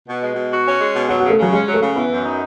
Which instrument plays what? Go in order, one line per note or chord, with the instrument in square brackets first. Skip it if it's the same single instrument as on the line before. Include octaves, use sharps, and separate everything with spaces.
[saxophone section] B2
G#3
B2
F#4
C#4
G#3
B2
[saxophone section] F#3 [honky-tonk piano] F#4
[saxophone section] C#3 [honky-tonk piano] F#4
[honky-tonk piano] A3
[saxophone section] C#3 [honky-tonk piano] F#3
[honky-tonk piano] G#3 [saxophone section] C#4
[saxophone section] F#3
[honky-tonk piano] A3
[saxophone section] C#3
[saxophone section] E3 [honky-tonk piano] B3
[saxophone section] F#2
D#4